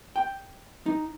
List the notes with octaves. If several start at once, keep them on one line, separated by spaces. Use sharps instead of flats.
G5
D#4